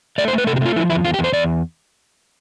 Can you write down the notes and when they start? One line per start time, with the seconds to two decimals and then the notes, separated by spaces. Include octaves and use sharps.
0.18 A3 D5
0.28 C5
0.33 A3
0.38 B4
0.47 C3 A4
0.56 G4
0.61 A3 F4
0.76 F3 E4
0.90 E2 E4
1.04 E2 F4
1.14 G4
1.19 E2
1.24 C5
1.33 E2 D5